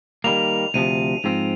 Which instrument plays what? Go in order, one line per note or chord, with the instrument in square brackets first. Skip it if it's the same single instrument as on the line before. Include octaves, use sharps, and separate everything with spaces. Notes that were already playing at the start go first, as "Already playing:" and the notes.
[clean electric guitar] D#3 G3 A#3 [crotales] F7
[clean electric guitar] D2 C3 F3 [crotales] D#7
[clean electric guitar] G#2 F3 C4 [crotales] F7